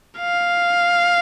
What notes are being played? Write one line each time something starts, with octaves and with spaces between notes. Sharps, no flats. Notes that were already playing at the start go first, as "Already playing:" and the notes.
F5